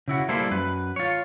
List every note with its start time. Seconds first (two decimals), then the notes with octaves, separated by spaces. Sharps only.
0.08 C#3 E4 F#4
0.29 G3 A#3 E4 A4 C5
0.51 F#2 B4
0.96 F4 C#5